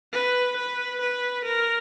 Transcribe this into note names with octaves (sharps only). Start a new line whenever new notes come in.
B4
B4
B4
A#4